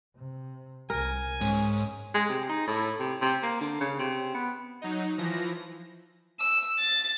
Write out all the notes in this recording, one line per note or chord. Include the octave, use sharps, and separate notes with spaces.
C3
C2 A#4 G#5
G#2 C#4
G#3
C3
D#4
A2
C3
C3
A#3
D3
C#3
C3
B3
F#3 D#4
E3 F3 A#6
E6
A6